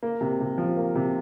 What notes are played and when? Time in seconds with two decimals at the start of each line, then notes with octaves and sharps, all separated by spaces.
0.03 A#3
0.21 C3
0.40 C3
0.58 F3
0.77 A#3
0.95 C3